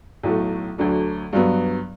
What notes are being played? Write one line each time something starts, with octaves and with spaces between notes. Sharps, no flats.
B1 A2 F#3 A3
D2 D3 F#3 A3 D4
G2 F#3 B3